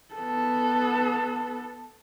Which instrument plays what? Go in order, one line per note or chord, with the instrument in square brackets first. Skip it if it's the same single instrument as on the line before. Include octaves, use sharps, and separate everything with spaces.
[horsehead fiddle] B3 A4